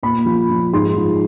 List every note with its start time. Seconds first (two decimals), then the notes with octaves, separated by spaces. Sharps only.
0.03 A#2 B5
0.26 F3
0.50 F3
0.73 G#2 C6
0.96 F3